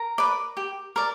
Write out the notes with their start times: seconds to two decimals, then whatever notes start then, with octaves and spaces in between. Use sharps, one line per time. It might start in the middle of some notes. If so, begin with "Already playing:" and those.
Already playing: A#4 A#5
0.18 B4 D5
0.57 G4
0.96 A#4 D5